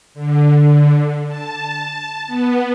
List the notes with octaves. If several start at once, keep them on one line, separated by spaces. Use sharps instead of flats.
D3
A5
B3